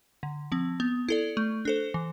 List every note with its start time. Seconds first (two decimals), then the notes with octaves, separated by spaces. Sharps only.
0.23 D3
0.52 F3 C4
0.80 B3
1.09 E4 A4 D5
1.37 A3
1.65 D4 A4 C5
1.94 E3